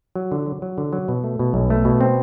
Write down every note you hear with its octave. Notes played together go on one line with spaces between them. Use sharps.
F#3
D3
F#3
F#3
D3
F#3
B2
A3
B2
B1
A3
B2
C4